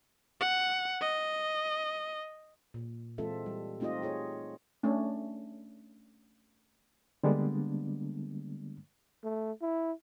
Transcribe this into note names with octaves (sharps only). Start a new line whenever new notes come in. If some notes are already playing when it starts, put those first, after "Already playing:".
F#5
D#5
A#2
E3 G#3 C4 F4 A4 E5
G3
A3 C4 D#4 F4 G4 D#5
F4 G#4 C#5
A3 C#4 D4
D3 G3 G#3 A#3 B3 D4
A3
E4